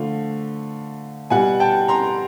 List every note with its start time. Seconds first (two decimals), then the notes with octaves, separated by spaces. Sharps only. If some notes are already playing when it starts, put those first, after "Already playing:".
Already playing: D3 F3 A3 F5
1.30 B2 G3 F#5 G#5
1.60 G5 A5
1.88 A#5 C6